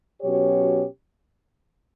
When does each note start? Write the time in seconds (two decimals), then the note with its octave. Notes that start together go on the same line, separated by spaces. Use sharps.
0.21 B2 F#3 C#4 G4 C#5